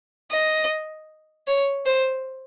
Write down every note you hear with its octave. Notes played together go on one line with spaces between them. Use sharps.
D#5
C#5
C5